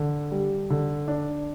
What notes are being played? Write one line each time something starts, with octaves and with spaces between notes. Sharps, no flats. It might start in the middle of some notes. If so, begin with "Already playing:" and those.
Already playing: D3
G3
D3
D4